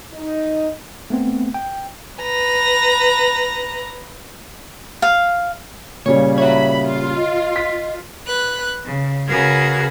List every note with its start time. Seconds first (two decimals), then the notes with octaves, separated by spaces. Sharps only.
0.14 D#4
1.10 A3 B3 C4
1.54 G5
2.20 B4 A#5
5.02 F5
6.06 A#2 C#3 G3 F4 C#5
6.38 F#4 C#5 E5 B5
6.87 F4
7.16 D#5
7.56 B6
8.26 B4 F#6
8.87 C#3
9.27 C#3 F#4 G#4 A#4 B4 G#6